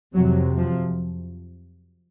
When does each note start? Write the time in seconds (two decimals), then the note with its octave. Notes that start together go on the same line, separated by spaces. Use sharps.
0.15 F2 C3 F#3
0.58 F3